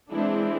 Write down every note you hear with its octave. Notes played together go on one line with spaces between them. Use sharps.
E3 G#3 C4 D4 E4